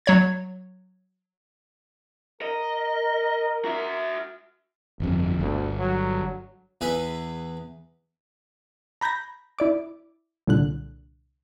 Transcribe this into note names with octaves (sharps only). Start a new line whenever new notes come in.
F#3 C#5 G#6
A#4 D#5
F#4 E5
G1 F2
G1 D2
F#3
E2 G#4 B4 E5
A#5 B5 G6 G#6 A#6
E4 D5 D6
C2 A#2 D3 F#6